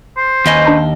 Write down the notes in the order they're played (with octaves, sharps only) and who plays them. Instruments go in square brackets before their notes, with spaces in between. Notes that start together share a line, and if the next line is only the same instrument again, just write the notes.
[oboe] C5
[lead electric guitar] D#2 D#5 [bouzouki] C#4 D#4 B4
[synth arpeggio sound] D4 A5 B5